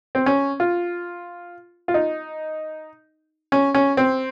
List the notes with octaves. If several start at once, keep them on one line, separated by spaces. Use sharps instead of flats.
C4
C#4
F4
F4
D#4
C#4
C#4
C4